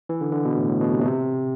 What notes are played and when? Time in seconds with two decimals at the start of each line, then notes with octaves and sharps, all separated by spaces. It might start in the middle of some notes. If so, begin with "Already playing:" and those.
0.09 E3
0.21 D3
0.33 D3
0.45 B2
0.57 A2
0.69 A2
0.81 B2
0.93 C3
1.01 B2
1.05 C3